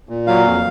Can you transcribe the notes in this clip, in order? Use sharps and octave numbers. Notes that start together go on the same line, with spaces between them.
A#2
F#3 F5
F2